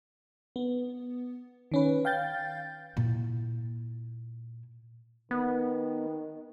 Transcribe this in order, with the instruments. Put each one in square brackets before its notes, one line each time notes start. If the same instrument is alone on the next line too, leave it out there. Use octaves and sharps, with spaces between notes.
[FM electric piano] B3
D#3 C#4 B4
F5 G5 G6 A6
[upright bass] A#2 E4
[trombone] D#3 [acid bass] B3